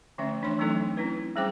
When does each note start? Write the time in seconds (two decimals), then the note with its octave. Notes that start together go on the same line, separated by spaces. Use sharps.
0.18 D3 F3 A3 C#4 E5
0.41 E3 A3 D4 C#5 C6
0.59 E3 F#3 A3 C4 D#4 A4
0.97 C4 C#4 E4 B4
1.36 G3 C#4 G#4 C5 G5 D6